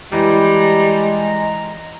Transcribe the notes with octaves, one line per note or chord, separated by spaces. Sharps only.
E3 G3 G#3 A#5